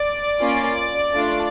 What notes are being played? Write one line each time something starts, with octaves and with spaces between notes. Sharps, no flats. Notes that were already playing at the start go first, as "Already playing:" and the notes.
Already playing: D5
A#3 C#4 F4
A3 D4 F4